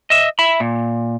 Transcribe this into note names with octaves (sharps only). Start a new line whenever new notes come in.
D#5 E5
E5 B5
A#2